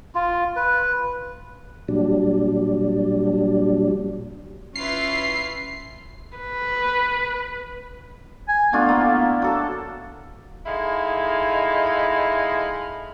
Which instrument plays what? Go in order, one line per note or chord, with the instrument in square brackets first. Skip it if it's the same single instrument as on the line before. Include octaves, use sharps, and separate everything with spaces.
[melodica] F4
B4
[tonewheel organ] A#2 F#3 G3 D4
[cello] C#4 E4 [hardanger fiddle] F4 B4 [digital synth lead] C7
[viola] B4
[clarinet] G#5
[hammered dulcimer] A3 D4 F4 [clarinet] B3
[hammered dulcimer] A#3 E4
F#3 A4 A5
[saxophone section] G#3 D#4 E4 A4 F5